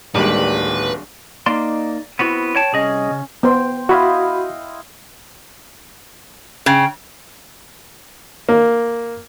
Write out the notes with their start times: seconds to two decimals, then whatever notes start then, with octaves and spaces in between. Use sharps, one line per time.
0.15 D1 D#3 G3 G#3 A#3 D4 B4
1.46 A#3 D#4 D5 C6
2.19 B3 C4 E4 F#4
2.56 C#5 G5 A5
2.73 C2 C#4 G#4 D#5
3.11 C#3
3.43 B3 C5 G5 C6
3.89 E4 F#4 D#5 F5 B5
6.66 C#3 G5
8.49 A#3